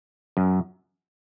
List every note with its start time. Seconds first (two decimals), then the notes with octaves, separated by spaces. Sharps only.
0.37 F#2